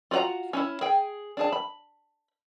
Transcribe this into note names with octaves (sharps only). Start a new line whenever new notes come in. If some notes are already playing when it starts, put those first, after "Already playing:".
F4 F#4 D5 F#5 A#5
C#4 D#4 E4
G#4 G5
D4 G#4 A5
B5